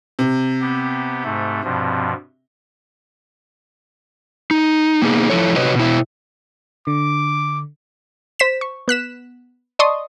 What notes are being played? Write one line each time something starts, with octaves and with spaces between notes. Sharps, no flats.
C3
B3 G4
G#2 A3
G2 B2 F3
D#4
A#3 B3 D#4 G#4
F3 E4 A4 C#5
C3 F#4 B4 C#5 D#5
B2 E4
D3 D6
C5 B6 E7
C#6
B3 F#6 B6 E7
D5 D#5 A5 C6 C#6 D#6